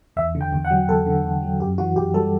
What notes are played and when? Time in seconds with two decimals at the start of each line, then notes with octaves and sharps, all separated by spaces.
0.16 E2 E5
0.35 D3
0.41 G5
0.53 E2
0.65 F#5
0.71 F#3
0.88 E2 A4
1.06 D3
1.25 E2
1.42 F#3
1.60 F#2 G4
1.78 E3 F#4
1.96 F#2 G4
2.14 G3 A4